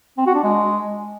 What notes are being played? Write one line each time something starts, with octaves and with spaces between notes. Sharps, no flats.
C4
F#4
D4
G#3